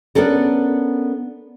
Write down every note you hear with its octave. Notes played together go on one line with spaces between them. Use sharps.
B3 C#4 D4 A4 A#4